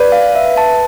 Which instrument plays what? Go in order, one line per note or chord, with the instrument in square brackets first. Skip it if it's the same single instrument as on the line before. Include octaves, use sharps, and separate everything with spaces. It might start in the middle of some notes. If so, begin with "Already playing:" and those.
Already playing: [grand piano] B4 [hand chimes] D5
[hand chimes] F5
E5
A5